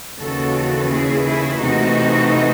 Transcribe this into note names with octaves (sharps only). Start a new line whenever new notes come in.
D#2 C#3 E3 F#4 A4
E4 G#4
E4 G#4
C3 E3 A3 D#4 F#4